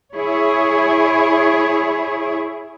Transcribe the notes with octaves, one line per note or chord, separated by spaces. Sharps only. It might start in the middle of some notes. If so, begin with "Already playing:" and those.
E4 G#4 C#5